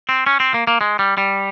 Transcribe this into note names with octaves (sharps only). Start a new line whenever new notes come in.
C4
C#4
C4
A#3
A#3
G#3
G3
G3